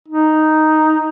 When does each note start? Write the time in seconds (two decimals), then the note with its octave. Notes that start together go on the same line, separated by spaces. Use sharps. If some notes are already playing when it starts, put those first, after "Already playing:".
0.08 D#4